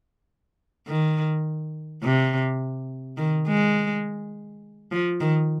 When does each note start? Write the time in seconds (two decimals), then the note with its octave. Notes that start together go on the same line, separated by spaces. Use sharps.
0.87 D#3
2.03 C3
3.17 D#3
3.47 G#3
4.91 F3
5.21 D#3